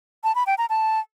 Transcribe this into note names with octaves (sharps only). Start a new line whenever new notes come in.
A5
B5
G5
A#5
A5